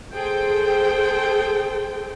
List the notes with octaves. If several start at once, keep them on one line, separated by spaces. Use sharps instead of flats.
G#4 A4 C5 G5